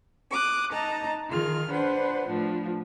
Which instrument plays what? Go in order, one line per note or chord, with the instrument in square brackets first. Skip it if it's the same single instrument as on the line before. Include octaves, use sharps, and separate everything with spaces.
[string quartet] D6 D#6 F#6
D#4 D#5 A5 A#5
D#3 F4 G#4 F6
D4 B4 C5 F#5
A2 F3 D4